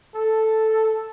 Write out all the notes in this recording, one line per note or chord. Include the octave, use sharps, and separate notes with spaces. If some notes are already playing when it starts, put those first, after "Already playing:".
A4